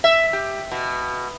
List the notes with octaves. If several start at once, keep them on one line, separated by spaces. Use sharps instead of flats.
E5
G4
B2